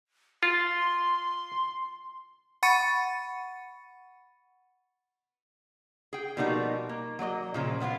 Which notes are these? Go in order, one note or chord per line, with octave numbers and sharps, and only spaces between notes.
F4 C6
F#5 B5 C#6 A6 C#7 D#7
G#4 G5
B2 F3 G3 A#3 D#4 F#4
A#3
F#3 A#3 D5 D#5
A#2 C#3 F3
G#3 B3 D4 F4